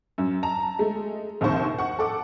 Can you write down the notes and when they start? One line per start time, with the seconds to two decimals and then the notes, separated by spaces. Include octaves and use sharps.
0.18 F#2
0.43 A5 A#5
0.79 G#3 A3
1.41 A#1 D#2 C3 C5 C#6
1.79 F#5 C#6
1.99 A4 F#5 D6